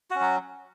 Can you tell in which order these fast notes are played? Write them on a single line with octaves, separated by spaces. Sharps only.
F#4 C#4 F#3